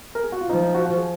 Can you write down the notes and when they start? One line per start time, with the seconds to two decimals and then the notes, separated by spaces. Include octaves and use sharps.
0.15 A#4
0.24 G#4
0.32 F#4
0.41 F4
0.50 F3 D#4
0.63 D#4
0.74 F#4
0.86 F#4
0.97 G#4